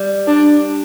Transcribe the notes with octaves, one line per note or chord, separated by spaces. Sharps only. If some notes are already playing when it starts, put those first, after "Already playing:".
Already playing: G3
D4